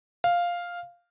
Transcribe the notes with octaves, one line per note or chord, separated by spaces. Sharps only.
F5